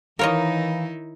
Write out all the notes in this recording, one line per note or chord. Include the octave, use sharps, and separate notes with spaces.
D#3 E3 D#4 E4 A#4 C#5 D#5 F5